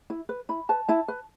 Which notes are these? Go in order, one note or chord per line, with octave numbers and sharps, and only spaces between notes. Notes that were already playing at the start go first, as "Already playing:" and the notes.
E4
B4
E4 B5
B4 A5
E4 A5
B4